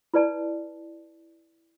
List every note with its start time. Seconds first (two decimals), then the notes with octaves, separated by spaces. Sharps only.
0.14 E4 B4 D5 A5